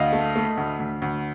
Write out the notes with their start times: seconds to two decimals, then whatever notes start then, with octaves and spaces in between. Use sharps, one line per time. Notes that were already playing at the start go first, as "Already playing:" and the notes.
Already playing: D2 D#5 F5
0.13 A3
0.36 A3
0.57 D2
0.79 D2
1.02 D2